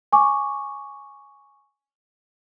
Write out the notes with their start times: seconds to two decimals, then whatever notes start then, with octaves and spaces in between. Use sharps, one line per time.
0.13 G#5 C#6 D6